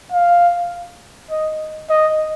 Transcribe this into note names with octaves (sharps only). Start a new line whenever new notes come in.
F5
D#5
D#5